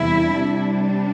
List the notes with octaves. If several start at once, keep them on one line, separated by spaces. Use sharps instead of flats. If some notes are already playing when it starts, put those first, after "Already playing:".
Already playing: E2 C3 G3 E4
C3 G3 D4